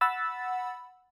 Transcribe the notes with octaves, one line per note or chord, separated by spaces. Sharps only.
F#5 B5 E6 A6